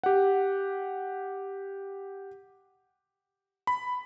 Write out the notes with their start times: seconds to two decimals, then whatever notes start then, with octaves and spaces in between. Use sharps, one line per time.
0.03 G4 F#5
3.67 B5